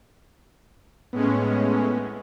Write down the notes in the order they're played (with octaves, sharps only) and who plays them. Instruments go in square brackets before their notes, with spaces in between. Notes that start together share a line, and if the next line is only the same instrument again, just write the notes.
[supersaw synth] A2 G#3 C#4 [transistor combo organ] B3